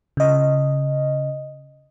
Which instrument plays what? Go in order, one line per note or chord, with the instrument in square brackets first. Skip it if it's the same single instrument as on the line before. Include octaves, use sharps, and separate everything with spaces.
[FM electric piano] C#3 D#5